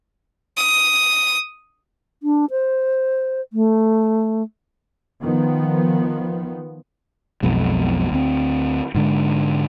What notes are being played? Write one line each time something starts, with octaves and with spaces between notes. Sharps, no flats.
D#6
D4
C5
A3
D#3 F3 B3
B1 F2 B2 G#3
D2 C4
G#2 D3 G#3